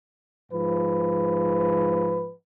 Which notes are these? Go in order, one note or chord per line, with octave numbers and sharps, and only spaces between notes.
G#2 F3 B4